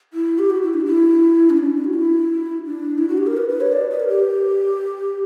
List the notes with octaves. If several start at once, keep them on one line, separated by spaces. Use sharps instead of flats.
E4
G4
F#4
E4
D4
E4
C#4
D4
C#4
D4
F#4
E4
D4
E4
F#4
G4
A#4
B4
B4
C#5
D5
B4
A#4
G4